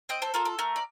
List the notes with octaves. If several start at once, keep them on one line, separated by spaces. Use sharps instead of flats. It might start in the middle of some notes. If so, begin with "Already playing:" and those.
C4 D#5 G5
A4 C5
F4 A4 A#4
A4
A3 A#4
D5